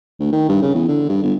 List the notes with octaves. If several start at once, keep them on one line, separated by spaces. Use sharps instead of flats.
D2
D#3
G2
C#3
E2
D3
G2
G1